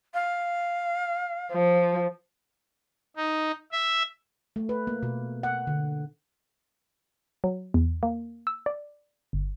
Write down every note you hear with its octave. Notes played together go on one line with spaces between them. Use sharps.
F5
F3
D#4
E5
A3
B4
A#3
B2
F#5
D3
F#3
E2
A#3
E6
D5
G1